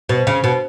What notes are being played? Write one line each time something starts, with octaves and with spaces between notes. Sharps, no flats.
B2
C#3
B2